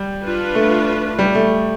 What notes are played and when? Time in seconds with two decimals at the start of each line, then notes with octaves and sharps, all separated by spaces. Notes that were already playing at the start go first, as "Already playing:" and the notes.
Already playing: G3
0.23 D4 F4 B4
0.55 A3
1.19 G3
1.35 A3